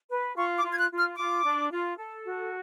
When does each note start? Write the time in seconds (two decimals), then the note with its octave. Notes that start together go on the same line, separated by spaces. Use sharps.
0.11 B4
0.36 F4 C#6
0.57 D6
0.64 F4
0.72 G#6
0.78 F#6
0.91 F4
0.97 F6
1.17 F4 D6
1.44 D4
1.70 F4
1.98 A4
2.25 F#4